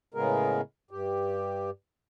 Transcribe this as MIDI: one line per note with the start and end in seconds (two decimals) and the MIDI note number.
0.14 0.61 45
0.14 0.61 49
0.14 0.61 56
0.14 0.61 59
0.14 0.61 68
0.14 0.61 70
0.91 1.70 43
0.91 1.70 67